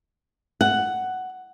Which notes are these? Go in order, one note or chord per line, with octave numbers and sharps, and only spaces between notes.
F#5